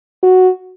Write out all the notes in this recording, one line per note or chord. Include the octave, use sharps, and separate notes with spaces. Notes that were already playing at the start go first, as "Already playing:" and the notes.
F#4